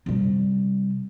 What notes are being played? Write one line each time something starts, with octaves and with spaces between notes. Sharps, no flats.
C3 G3